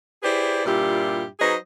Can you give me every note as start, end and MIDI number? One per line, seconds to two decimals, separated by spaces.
0.23 0.64 64
0.23 0.64 67
0.23 0.64 68
0.23 0.64 71
0.23 0.64 72
0.23 0.64 74
0.65 1.24 43
0.65 1.24 46
0.65 1.24 55
0.65 1.24 64
0.65 1.24 65
0.65 1.24 67
1.40 1.55 54
1.40 1.55 63
1.40 1.55 68
1.40 1.55 71
1.40 1.55 72
1.40 1.55 75